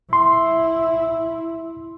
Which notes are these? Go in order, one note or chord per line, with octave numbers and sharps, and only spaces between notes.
E4 C6